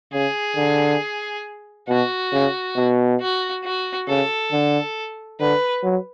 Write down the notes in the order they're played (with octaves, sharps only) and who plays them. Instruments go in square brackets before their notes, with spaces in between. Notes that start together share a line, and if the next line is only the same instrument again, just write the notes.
[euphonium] C#3 [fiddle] G#4
[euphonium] D3
[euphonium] B2 [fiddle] F#4
[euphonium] C#3
B2
[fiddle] F#4
F#4
[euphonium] C#3 [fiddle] A4
[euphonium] D3
[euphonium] D3 [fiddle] B4
[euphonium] F#3